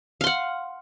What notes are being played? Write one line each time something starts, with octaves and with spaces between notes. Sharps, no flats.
F5 F#5 C6